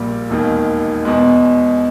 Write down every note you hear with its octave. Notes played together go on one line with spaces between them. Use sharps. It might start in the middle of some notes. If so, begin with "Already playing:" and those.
Already playing: A#1 A#2 G3
E1 D#2 D#3
E2 B2 G#3